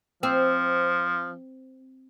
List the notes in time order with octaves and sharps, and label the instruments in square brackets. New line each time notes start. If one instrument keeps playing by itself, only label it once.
[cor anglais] F3 [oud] C4